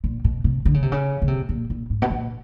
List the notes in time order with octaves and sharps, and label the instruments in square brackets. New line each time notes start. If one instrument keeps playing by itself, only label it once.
[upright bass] A#2
B2
C3
D3
C#3
C3
C#3
C#3
C3
A#2
A#2
G#2
B2
A#2